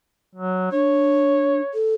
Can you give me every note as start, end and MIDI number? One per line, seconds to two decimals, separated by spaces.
0.35 0.67 54
0.72 1.61 62
0.72 1.74 73
1.74 1.94 69